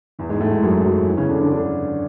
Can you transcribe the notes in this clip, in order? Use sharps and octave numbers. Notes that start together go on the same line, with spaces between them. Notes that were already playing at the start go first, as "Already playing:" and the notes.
E2 E3
G#2 G#3
A2 A3
G#2 G#3
F#2 F#3
F#2 F#3
E2 E3
C#3 C#4
D3 D4
D3 D4
D3 D4